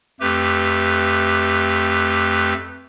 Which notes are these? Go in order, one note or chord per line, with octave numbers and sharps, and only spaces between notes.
F2 A3 G4 B4